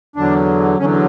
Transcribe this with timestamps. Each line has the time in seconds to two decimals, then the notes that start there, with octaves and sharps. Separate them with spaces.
0.16 E2 D3 F#3 D4
0.79 E2 D3 F#3 C#4